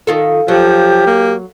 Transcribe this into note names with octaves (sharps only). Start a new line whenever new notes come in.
D#3 F4 A4
F3 F#3 G4
A#3